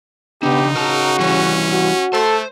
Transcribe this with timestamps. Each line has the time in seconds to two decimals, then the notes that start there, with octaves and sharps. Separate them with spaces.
0.43 C#3 B3 D4 D#4 G4
0.76 C#3 F#4 A#4 A5 A#5
1.19 E3 G3 C#4
1.71 F#4
2.13 A3 A4 C5